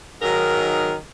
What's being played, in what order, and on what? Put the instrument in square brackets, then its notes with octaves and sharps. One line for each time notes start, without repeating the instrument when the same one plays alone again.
[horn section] G#2 D#3 F#3 A#4